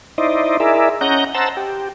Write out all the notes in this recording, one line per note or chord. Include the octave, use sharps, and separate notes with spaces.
D#4 E4 C5 D5 D#5
E4 G#4 A#4 D5 E5
C#4 D#5 F#5 A#5 G6
C5 F#5 A5 A#5 E6
G4